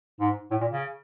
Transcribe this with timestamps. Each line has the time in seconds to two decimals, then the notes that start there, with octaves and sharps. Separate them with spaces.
0.20 G#2
0.51 A2
0.61 A#2
0.71 C#3